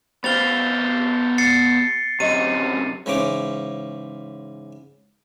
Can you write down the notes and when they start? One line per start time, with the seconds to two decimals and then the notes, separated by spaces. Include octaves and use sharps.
0.24 B3 G4 C5 F5 G#5 A6 F7 G7
1.38 A6 C7 C#7
2.20 F#2 C3 G4 D#5 D#7
3.06 G#2 C#3 E3 C#4 D6